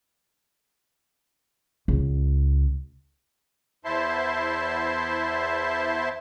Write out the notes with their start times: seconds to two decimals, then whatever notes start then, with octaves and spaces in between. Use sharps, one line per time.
1.88 C#2
3.85 E2 E4 C5 E5 A5 C6